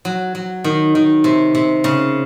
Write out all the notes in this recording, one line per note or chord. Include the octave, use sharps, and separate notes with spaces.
F#3
F#3
D#3
D#3
C3
C3
C#3